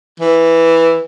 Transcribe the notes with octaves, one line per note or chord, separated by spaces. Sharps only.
E3